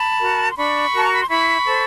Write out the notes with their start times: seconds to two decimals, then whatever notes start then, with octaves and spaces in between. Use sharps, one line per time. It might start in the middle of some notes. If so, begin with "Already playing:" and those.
Already playing: A5 B5
0.20 F#4 A#4
0.50 C6
0.56 D4 B5 C#6
0.92 F#4 A#4 A5
1.04 A#5
1.12 B5
1.20 C6
1.28 E4 B5 C#6
1.64 A4 C5